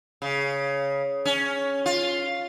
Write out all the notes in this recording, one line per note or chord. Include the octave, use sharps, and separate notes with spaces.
C#3
C#4
F4